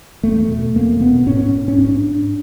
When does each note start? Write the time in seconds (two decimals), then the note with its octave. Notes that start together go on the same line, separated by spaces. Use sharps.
0.23 E2 A3
0.49 B2
0.75 E2 A#3
1.01 B2 B3
1.27 G#2 C#4
1.68 C#4
1.78 G#2 D4